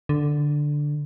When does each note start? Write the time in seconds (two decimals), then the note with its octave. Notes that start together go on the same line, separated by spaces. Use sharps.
0.09 D3